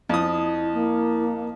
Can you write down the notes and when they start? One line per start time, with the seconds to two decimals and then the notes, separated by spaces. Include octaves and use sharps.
0.09 F2 E4 D#6
0.73 A#3